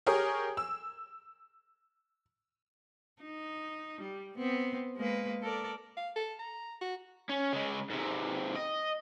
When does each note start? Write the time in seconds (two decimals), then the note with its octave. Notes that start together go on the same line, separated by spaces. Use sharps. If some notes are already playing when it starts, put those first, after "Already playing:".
0.07 G4 G#4 A#4 C#5 A#5 D#6
0.57 E6
3.22 D#4
4.01 G3
4.38 B3 C4
4.97 G#3 A#3 B4
5.42 A4 A#4 D5
5.97 F5
6.16 A4
6.39 A#5
6.81 F#4
7.29 C#4
7.53 C#3 G#3
7.90 G#2 C3
8.55 D#5